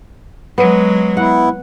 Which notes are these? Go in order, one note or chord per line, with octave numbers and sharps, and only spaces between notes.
F#3 G#3 B3
B3 E4 F#5